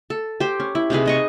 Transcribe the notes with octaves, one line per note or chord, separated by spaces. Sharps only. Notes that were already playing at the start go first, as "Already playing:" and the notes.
A4
G4 C5
C#4
E4
C3 D#4 G#4 B4
D#4 D#5 C#6